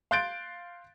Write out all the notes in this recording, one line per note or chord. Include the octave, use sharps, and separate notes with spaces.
F5 C6 F#6 G6 A6 D7